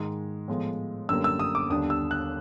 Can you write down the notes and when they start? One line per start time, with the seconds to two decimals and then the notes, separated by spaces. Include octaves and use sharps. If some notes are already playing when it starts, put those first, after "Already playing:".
Already playing: G#2 D#3 G#3
0.48 A2 F3 G#3 B3
1.09 F#2 D3 G3 A#3 E6
1.24 E6
1.39 D#6
1.55 D6
1.69 D#2 D3 G3 B3 D4 D#6
1.90 E6
2.11 F#6